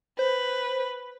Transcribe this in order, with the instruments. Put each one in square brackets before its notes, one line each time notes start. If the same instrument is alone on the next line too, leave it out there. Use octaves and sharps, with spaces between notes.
[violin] B4 [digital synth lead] C5